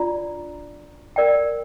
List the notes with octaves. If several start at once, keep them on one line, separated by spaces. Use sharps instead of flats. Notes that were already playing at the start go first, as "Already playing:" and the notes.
Already playing: D4 F4 D5 A#5
A#4 D5 G5